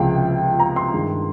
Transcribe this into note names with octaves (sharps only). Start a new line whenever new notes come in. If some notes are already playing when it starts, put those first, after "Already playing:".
Already playing: C#2 C3 F3 G#3 F5 G5
A#5
C6
G2 D#3 G#3